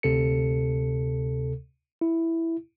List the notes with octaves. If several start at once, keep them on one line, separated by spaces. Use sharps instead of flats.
D2 C3 A4 C#7
E4